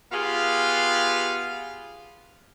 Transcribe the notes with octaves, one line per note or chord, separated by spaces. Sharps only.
B3 F4 G4 G#4 F5